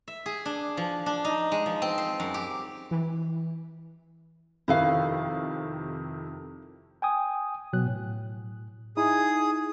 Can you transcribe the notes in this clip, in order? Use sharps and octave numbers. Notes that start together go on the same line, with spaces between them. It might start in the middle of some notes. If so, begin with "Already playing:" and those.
E5
G#4
D4
F3
D4
D#4
G#3
F3
C4
C5
F#2
G4
E3
F2 C3 D#3 E4 B4 F5
G5 G#5 D#6
B2 F#3 F#6
A2
D#4 E4 G#4 D#6